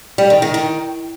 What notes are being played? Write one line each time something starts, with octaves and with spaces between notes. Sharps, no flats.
G3
D#3
D#3
D#3